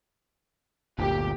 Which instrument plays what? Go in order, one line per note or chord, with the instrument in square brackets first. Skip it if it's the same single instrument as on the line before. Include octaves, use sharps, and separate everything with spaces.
[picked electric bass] G1 D2 A#2 [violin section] G4